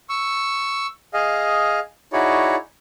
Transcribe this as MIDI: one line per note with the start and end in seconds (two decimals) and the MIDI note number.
0.09 0.87 85
0.09 0.87 88
1.14 1.80 68
1.14 1.80 75
1.14 1.80 77
2.13 2.56 63
2.13 2.56 64
2.13 2.56 66
2.13 2.56 68
2.13 2.56 73
2.13 2.56 74